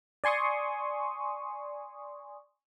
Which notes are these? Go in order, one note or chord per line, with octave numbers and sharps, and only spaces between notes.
D5 G#5 C6 C#6 D#6